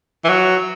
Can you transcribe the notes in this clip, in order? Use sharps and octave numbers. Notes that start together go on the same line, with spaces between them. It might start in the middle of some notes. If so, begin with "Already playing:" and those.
E3
F#3